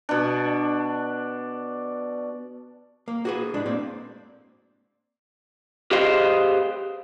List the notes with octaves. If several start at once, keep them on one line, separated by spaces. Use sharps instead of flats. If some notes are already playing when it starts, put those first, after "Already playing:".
B2 D4
A#3
F#4 G#4 B4
A2 G#3 D4
A#3 C4 D5
G4 G#4 B4 C5 D#5 F5